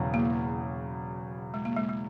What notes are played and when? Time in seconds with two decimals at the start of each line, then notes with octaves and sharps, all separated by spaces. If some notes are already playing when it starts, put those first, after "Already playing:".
Already playing: E1 E2 C#3 F#3
0.14 A#3
1.54 G#3
1.65 A#3
1.76 G#3
1.89 G#3